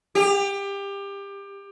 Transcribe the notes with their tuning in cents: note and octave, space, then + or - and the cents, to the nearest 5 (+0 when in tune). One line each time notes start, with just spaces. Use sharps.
G4 +25